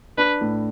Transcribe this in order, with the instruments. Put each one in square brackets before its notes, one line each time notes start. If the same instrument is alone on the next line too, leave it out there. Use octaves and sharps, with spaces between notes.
[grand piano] D4 [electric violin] B4
[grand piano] A2